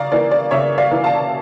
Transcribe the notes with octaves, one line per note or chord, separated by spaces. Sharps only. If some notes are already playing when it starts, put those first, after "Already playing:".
Already playing: C#3 D5 F5 A#5
E3 A#3 D5
D5
C#3 C#5 E5
D5 F5
E3 A#3
F5 A5